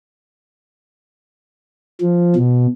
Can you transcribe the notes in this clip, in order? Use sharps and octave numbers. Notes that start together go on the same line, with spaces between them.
F3
B2